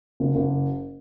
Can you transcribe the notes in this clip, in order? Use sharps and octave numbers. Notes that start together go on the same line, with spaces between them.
F#1
F#1